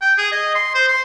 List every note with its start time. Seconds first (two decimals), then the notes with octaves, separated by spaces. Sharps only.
0.01 G5
0.18 G#4
0.32 D#5
0.55 C6
0.75 C5
0.88 C6